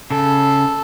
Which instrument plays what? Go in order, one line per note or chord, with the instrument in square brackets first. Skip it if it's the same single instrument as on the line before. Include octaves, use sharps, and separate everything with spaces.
[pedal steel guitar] C#3 [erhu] A4